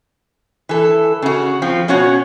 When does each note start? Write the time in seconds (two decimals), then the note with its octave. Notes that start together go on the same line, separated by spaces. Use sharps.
0.69 E3 A4
1.22 C#3 F#4
1.62 F3 C4
1.88 B2 C#4 F#4 C#5 F#5